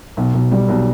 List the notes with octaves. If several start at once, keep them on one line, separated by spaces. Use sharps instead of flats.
B1
B1
G3
B1